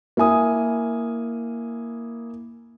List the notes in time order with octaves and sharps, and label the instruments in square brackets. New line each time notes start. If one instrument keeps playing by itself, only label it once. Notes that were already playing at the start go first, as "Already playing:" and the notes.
[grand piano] A#3 E4 G#5 D#6